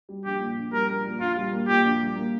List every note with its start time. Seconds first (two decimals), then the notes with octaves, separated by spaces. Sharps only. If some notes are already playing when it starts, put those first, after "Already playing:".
0.09 G3
0.24 A#1 G4
0.40 A#2
0.57 A#1
0.72 G3 A#4
0.89 A#1
1.04 A#2
1.20 A#1 F4
1.36 G3
1.53 A#3
1.68 A#2 G4
1.84 A#1
1.99 G3
2.16 A#3